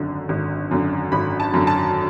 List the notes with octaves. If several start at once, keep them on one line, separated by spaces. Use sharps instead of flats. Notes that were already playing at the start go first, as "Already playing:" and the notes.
Already playing: G#1 F#2 D3
G#1
F#2 D3
G#1 B5
A5
F#2 D3
A5